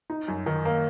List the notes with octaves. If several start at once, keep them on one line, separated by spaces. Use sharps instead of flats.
D#4
F#2
D#3
A#3